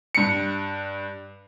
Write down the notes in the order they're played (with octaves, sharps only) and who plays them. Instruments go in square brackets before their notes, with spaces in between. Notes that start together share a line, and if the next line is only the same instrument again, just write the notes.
[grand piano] G2 C#7